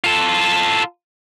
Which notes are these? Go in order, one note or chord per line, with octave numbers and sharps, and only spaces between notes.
F4 A4